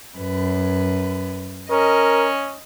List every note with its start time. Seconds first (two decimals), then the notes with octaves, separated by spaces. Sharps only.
0.17 F#2 B4
1.71 C#4 A#4 D#5